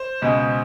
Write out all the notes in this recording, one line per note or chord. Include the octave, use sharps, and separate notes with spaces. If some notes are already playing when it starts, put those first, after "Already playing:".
Already playing: C5
C#2 B2 G#3